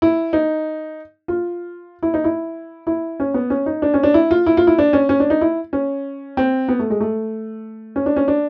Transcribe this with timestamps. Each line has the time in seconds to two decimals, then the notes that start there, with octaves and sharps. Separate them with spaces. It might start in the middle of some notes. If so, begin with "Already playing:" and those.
0.02 E4
0.33 D#4
1.28 F4
2.03 E4
2.14 D#4
2.24 E4
2.87 E4
3.20 C#4
3.34 B3
3.50 C#4
3.66 D#4
3.82 D4
3.94 C#4
4.03 D4
4.14 E4
4.31 F4
4.47 E4
4.57 F4
4.67 E4
4.78 D4
4.93 C#4
5.09 C#4
5.20 D4
5.30 D#4
5.41 E4
5.73 C#4
6.37 C4
6.68 B3
6.79 A3
6.90 G#3
7.00 A3
7.96 C#4
8.06 D4
8.16 C#4
8.28 D4